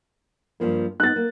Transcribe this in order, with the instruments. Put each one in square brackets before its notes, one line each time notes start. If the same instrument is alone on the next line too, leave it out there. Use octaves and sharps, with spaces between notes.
[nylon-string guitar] G2 F3 A#3
[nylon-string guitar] B3 D#4 [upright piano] F#6 A6
[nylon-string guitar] A#3